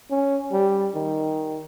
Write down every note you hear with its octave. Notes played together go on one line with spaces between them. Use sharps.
C#4
G3
D#3